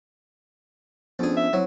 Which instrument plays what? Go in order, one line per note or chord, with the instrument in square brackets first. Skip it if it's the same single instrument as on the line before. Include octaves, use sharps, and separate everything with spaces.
[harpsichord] F2 G#4 [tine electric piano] B3 C#4 D4
[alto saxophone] E5
[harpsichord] F#3 [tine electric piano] C4 E4 C5